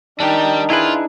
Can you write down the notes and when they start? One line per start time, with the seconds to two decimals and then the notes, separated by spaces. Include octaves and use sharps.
0.20 D#3 G3 D4 D#4 G4
0.70 E4 F4 G#4 B4